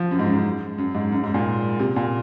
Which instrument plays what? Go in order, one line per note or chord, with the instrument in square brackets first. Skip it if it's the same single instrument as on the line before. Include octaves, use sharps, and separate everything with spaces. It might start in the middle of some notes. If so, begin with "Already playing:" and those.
Already playing: [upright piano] F3
F#2
G#2
F#2
F#2
G#2
F#2
G#2
A#2
C3
A#2